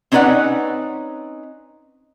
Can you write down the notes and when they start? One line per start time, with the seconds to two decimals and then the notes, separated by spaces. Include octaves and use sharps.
0.12 C4 C#4 D#4 B4 D5 F#5